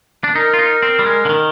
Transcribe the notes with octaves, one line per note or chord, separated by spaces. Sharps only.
D4
D#4 A#4
F4
D#4
C4
G3
G#3
D3
D#3